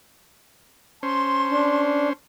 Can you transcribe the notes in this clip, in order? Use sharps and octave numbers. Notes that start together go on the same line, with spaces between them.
C#4 C5 A5 C6
D4